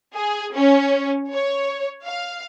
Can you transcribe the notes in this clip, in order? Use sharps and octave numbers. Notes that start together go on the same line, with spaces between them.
G#4
C#4
C#5
F5